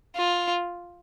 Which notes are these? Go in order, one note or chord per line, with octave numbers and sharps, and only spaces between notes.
F4